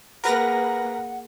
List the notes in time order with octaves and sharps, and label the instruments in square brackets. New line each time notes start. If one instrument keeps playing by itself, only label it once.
[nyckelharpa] A#3 G#4 [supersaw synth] A#4 B4 A#6 [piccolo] F#5 [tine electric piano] A#5